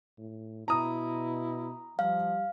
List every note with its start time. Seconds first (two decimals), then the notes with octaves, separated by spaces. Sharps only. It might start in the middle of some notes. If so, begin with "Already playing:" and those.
0.18 A2
0.68 B2 E4 A#5 D#6
1.99 F3 G3 F5